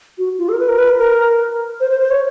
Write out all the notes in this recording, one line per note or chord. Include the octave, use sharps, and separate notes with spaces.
F#4
F4
A4
A#4
B4
A#4
B4
A#4
C5
C5
C5
C#5